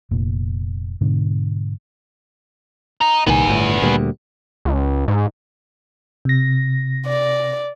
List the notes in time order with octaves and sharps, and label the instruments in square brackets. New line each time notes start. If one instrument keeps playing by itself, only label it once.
[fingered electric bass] F1 A#2
G#2 B2 D3
[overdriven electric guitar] D#5 A#5
[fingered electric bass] C2 A#2 D#3 [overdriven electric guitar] B3 G#5
[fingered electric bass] G1 A2
D2 A#2 G3
[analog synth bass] C#2
G#2
[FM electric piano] C3 A#6
[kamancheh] D5